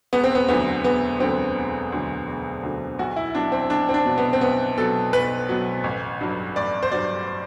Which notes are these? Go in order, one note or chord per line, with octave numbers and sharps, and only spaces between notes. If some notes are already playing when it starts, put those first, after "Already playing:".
E1 B3
C4
B3
D2 D3 F#3 B3
E1 B3
D2 D3 F#3 C4
E1
D2 D3 F#3
E1
D2 D3 F#3
B1 F#4
E4
B2 F#3 D4
C4
B1 D4
C4
D4
B2 F#3
B3
C4
B1 B3
B2 F#3 A4
B1 B4
B2 F#3
A1
G2 F#3
A1 D5
C5
G2 F#3 D5